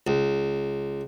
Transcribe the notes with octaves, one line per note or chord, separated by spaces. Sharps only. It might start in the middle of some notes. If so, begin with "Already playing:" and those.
C#2